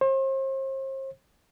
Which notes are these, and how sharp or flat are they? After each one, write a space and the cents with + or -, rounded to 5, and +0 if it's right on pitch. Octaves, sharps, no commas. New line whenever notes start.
C5 +40